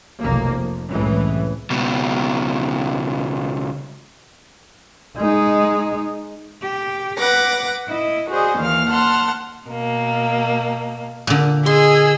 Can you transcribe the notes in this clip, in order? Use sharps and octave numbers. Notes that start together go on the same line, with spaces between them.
F1 B1 D#3 A#3
F2
C2 F#2 A2 E3 G#3
C#2 B2
G#3 D#4
G4
B4 F#5 D6 A#6
E4 D#5
F#4 G#4 C5 D5 D#5
D#2 E3 F5 F6
F#5 A5 C6 F6
B2 A#3
A#2 D3
G#4 D#5 C6 E6